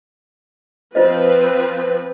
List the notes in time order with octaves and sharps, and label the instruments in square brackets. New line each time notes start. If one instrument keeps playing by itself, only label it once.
[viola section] F3 C4 B4 [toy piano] F4 C5 D#5